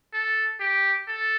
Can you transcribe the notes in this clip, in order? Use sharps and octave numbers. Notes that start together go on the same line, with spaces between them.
A4
G4
A4